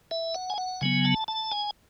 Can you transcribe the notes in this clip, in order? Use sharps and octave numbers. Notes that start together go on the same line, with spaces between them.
E5
F#5
G#5
F#5
C#3 F#3 B3 G#5
A5
A5
G#5